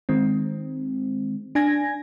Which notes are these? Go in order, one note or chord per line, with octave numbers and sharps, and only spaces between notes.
D#3 G#3 C4
D4 G#5 G#6 A#6